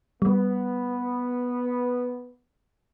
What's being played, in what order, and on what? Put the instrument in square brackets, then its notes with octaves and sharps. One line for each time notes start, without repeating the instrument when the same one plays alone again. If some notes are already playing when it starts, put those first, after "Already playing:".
[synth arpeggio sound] G3 [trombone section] B3